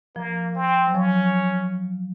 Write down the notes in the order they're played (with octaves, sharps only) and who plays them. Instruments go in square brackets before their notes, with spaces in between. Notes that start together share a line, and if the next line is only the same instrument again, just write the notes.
[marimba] F3 [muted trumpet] A#3
[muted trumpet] C4
[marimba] F#3
[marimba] F3 [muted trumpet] C#4